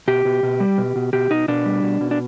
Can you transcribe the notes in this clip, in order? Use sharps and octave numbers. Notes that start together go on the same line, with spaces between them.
B2 G4
B2
B2
G3
B2
B2
B2 G4
B2 D#4
B2 D4
G3
B2
B2
D4